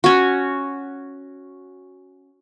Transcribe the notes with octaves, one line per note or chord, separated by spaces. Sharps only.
C#4 F#4